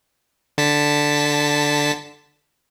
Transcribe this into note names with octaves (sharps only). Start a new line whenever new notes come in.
D3 A5 B6